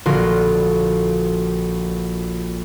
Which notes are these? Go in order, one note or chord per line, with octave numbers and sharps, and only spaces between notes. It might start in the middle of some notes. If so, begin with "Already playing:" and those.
A#1 D3 A#3 F4 F#4